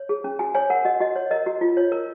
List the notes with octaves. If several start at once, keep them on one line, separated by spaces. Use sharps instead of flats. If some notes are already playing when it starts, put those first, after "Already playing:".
Already playing: C#5
G#4
C#4
F#4 G#5
C#5 G#5
A#4 F#5
F#4 D#5
F#4 D#5
C#5
A#4 D#5
F#4
F4
C#5
A#4